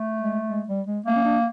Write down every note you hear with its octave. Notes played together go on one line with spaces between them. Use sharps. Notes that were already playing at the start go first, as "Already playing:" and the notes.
Already playing: A3
G#3
G#3
G3
G#3
A3 A#3
C#4
D4